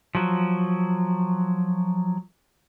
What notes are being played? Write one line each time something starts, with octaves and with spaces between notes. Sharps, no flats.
F3 F#3